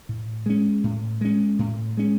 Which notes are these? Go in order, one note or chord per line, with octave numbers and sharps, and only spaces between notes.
A2
G#3 C#4
A2
G#3 C#4
A2
G#3 C#4